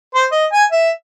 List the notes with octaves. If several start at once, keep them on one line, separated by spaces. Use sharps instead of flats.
C5
D#5
G#5
E5